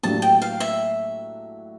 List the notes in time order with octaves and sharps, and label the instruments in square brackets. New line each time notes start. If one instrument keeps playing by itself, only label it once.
[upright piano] A2 F#3 A#3 D4 G4 [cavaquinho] A5
[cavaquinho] G5
F5
E5